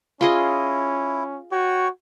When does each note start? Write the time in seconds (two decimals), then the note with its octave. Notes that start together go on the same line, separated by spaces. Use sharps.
0.21 C#4 E4 F4 G#4 D#5
1.52 F#4 C#5 G5 C#6